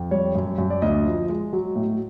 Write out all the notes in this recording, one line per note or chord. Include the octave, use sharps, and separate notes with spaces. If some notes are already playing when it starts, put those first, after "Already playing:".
Already playing: F2
G3 C#5
F#2
F#2
D5
D2 D#5
F3
G#3
F#3
A2